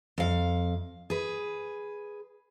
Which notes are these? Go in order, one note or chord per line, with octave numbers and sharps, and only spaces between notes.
F2 F5
G#4 B4